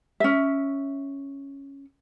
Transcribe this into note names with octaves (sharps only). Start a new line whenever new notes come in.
C#4 E5